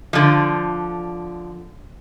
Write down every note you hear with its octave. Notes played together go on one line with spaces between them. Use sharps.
D3 F3